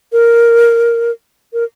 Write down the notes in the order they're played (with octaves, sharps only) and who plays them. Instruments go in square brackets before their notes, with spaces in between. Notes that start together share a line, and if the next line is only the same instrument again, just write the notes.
[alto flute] A#4
A#4